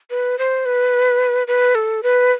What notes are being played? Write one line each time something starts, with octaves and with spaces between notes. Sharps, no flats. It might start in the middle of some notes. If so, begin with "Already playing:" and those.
B4
C5
B4
B4
A4
B4